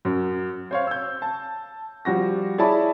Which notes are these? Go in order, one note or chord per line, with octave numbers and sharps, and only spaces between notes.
F#2
C5 C#5 F5
E6 G6
A5
F3 G3 F#4 A#6
E4 G#4 C#5 D5 A5 B5